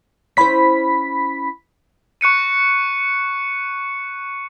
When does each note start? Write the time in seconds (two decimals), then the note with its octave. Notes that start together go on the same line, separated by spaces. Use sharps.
0.37 C#4 E4 C5 B5 B6
2.21 C#6 F#6 C#7 D#7